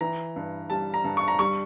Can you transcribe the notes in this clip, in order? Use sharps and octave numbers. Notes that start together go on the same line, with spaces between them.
E3 A#5
G2
G3 A5
A#5
G2
C#6
A#5
G3 C#6